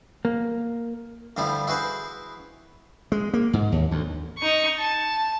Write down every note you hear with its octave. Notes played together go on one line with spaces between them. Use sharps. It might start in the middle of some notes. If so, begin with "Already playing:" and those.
A#3
D2 G2 F3 G3 E4 F4
E4 F#4 G#4 B4 C5
G#3
A#3
G#2
D#2
D2
D#4 C#6
A5